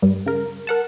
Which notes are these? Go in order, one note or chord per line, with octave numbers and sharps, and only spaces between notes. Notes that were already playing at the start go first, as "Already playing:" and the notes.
G2 G3
C#3 A#4
A#4 F#5 A5